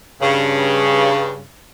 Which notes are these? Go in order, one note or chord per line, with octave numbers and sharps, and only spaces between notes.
G2 C#3